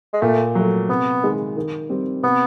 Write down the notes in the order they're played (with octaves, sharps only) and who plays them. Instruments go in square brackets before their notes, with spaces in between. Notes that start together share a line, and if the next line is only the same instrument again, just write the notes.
[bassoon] G#3
[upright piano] A#2 [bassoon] A3
[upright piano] F#3 A3
[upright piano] C3 [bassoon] B3
[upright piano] D#3 G#3
D#3
G3 C4
[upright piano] C3 [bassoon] B3